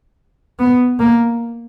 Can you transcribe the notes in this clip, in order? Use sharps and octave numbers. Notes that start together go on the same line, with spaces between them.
B3
A#3